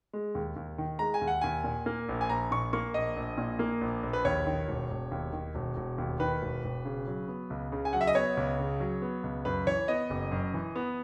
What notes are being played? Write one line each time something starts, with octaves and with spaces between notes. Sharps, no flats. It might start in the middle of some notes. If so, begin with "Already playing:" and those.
G#3
D#2
D#2
D#3
G#3 A#5
G#5
D#2
F#5
D#2 G#5
A#2
A#3
A#1
G#5
A#1 A#5
A#2 C#6
A#3 C#6
A#1 D#5
A#1
A#2
A#3
A#1
A#1
B4
D#2 C#5
D#3
E1
E1
D#2
D#3
E1
E1
D#2
D#3 B4
E1
E1
C#3
F#3
B3
C#2
C#3
G#5
F#3 F#5
E5
D#5
B3 C#5
C#2
C#3
F#3
B3
C#2
F#2 B4
E3 C#5
B3 D#5
F#1
F#2
E3
B3